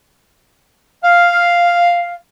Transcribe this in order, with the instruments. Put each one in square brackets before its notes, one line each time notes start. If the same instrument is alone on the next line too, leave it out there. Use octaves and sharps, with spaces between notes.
[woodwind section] F5